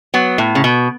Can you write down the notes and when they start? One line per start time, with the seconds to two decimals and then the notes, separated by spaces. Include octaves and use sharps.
0.14 F#3 B3
0.38 A2
0.55 C#3
0.64 B2